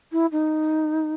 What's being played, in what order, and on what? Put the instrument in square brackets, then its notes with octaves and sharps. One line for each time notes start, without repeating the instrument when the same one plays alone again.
[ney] E4
D#4